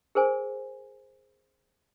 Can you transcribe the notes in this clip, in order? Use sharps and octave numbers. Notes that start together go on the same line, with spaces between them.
G#4 A#4 C5 G#5